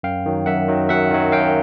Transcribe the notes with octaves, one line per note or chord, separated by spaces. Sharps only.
F#2 F5 G5
D#3 F#3
F#2 E5 F#5
D#3 F#3
F#2 E5 F#5
D#3 F#3
F#2 F5 G5